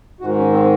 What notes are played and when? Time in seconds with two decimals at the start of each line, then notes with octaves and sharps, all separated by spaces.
0.20 G#2 F#4
0.24 D#3
0.37 C#4
0.52 C4